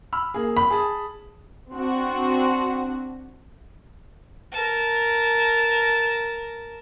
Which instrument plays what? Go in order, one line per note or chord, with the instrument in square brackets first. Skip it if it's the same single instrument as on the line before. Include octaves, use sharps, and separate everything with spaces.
[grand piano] B5 E6 F6
A#3 G#4
[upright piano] B5
[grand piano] G#4 A5 D#6
[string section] C4 D4 F#4
[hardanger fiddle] A#4 A5